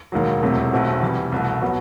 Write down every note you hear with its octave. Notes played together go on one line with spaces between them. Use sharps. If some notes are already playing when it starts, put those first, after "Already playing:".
E1 D#2 D#3 F#3
E1 E2 C3 F#3 A3
B1 B2 A3 C4 F#4
E2 C3 E3 G3
C2 B2 A3
B2 F#3 B3